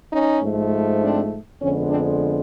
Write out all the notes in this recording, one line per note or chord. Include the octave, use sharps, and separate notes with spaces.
C#4 D#4
G#2 F3 A3
C4 D4
F2 D3 F3 G#3 B3 C#4
C4 D4